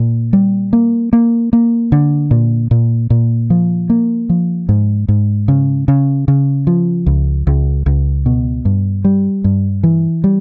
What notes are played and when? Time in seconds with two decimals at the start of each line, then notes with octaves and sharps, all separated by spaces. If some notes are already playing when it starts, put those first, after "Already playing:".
Already playing: A#2
0.33 G3
0.73 A#3
1.13 A#3
1.53 A#3
1.92 D3
2.31 A#2
2.71 A#2
3.10 A#2
3.50 F3
3.90 A#3
4.29 F3
4.69 G#2
5.08 G#2
5.48 C#3
5.88 C#3
6.28 C#3
6.67 F3
7.06 C#2
7.47 C#2
7.86 C#2
8.26 B2
8.65 G2
9.05 G3
9.44 G2
9.83 E3
10.24 G3